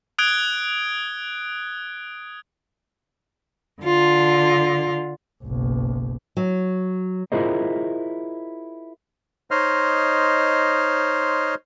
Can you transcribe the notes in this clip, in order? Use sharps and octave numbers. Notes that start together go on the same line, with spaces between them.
D#6 F#6 G#6 D7 G7
D3 F4
F#1 B1
F#3
E4 F4 G#4 A#4 C5 D#5
D#4 C5 C#5 D#5 C6 F6